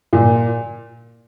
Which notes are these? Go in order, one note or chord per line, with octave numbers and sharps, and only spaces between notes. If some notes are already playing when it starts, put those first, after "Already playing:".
A#2